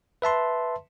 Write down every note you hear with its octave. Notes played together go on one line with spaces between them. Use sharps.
B4 E5 A5 C6